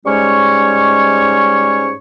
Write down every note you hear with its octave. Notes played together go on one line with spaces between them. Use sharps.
G#2 G3 G#3 C#4 C#5 C#6